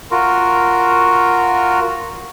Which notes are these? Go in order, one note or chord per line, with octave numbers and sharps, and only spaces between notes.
F4 F#4 A#4